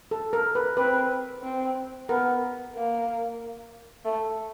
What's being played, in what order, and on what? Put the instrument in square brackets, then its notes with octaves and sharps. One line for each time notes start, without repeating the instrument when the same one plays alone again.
[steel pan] A4
A#4
B4
[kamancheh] C4 [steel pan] B4
[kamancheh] C4
[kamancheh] B3 [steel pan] A#4
[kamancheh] A#3
A3